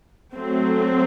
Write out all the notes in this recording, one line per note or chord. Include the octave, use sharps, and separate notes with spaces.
F#3 A3 C4